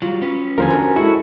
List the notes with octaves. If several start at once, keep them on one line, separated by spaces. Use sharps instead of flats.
F#3 G3 F4
C#4 B4
D#2 D3 F3 A#4 C5 G#5
D4 F#4 A#5
G#3 E4 F#4 A4